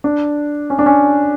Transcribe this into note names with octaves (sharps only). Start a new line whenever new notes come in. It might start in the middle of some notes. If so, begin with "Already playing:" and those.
D4
C#4
D4
C#4